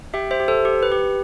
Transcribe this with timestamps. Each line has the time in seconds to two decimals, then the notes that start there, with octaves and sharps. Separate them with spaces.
0.14 G4 E5 G5
0.31 C5 E5
0.40 G4
0.48 A4 C5
0.65 G4
0.83 B4
0.92 G4